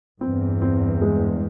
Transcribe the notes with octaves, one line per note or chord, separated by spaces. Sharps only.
E2 G2 C4
C4
G#3